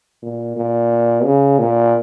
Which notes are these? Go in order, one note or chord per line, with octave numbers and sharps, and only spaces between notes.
A#2
A#2
C#3
A#2